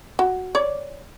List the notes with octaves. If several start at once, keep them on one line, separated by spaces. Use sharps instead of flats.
F#4
C#5 D5